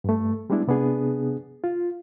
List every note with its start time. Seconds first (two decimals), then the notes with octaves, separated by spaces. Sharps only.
0.04 G2 A3
0.50 G3 G#3 B3 D4 E4
0.68 C3 B3 D4 G#4
1.64 F4